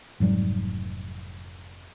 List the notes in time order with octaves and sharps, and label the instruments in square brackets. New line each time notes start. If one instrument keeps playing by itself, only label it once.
[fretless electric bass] F1 G#2 F#3 G3